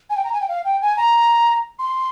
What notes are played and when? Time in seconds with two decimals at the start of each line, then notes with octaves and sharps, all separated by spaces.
0.10 G#5
0.16 G5
0.24 A#5
0.32 G#5
0.41 G5
0.48 F5
0.65 G5
0.82 G#5
0.97 A#5
1.79 C6